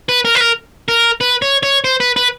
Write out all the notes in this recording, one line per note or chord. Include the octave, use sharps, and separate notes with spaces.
B4
A#4
B4
A#4
A#4
B4
C#5
C#5
C5
B4
B4